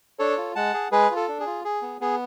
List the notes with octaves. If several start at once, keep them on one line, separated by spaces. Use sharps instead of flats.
D4 A4 C#5
F4
G#3 F#5 A5
G#4
G#3 G#4 B4
F4
A4
D4
G#4
F4
G#4
B3
B3 G#4